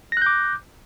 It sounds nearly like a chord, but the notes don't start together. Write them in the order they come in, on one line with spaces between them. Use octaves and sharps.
A#6 F#6 G6 D6